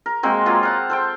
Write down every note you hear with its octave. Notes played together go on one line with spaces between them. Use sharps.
A#4
G#3 A#3 C4 F#4
F#3 A#3 F4
F5 F#5 A5
A4 C5 G5